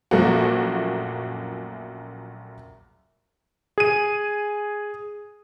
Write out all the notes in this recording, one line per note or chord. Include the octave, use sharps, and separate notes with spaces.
A#1 F#2 F3 A3 A#3 F#4
G#4 D#7